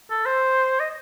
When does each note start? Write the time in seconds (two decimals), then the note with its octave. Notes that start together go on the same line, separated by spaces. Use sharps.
0.11 A4
0.26 C5
0.80 D#5